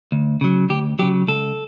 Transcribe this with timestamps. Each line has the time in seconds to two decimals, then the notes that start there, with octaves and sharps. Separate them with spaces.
0.12 D2
0.41 C#3 F#3
0.69 D2 G4
0.99 C#3 F#3 G4
1.28 C#2 A4